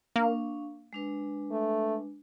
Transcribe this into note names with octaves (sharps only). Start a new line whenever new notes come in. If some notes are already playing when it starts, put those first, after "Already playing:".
A#3 D4 F5 C#6
G#3 D4 B4
A3